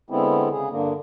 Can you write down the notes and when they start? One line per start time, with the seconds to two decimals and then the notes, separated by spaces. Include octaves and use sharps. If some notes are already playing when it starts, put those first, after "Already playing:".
0.10 D3 G#3 B3 C4 E4
0.51 C#3 G#4
0.71 G2 D3 A#3